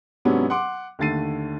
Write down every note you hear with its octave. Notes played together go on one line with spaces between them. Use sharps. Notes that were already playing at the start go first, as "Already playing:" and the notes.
G#2 C3 F#3 B3 C#4 D4
F#5 C6 D6
D#2 D3 A3 A6 C7 D#7